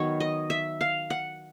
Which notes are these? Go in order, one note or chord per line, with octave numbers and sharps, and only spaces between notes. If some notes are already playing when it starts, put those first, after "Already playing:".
Already playing: D#3 F#3 B3 C#5
D#5
E5
F5
F#5